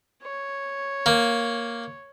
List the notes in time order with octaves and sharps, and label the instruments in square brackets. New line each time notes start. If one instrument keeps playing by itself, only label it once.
[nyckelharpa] C#5
[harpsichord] A#3